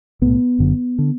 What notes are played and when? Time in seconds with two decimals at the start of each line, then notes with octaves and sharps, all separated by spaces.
0.22 B1 A2 B3
0.59 F#1 F#2 D3
0.98 D3